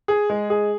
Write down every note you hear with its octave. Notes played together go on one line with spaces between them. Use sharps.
G#4
G#3
G#4